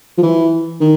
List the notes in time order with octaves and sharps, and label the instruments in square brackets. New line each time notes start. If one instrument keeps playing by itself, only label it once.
[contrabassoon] F3
E3
D#3